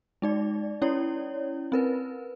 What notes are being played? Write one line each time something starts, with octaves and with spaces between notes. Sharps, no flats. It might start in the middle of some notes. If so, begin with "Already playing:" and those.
G#3 D#4 D5
C#4 E4 C#5 D5
C4 A#4 B4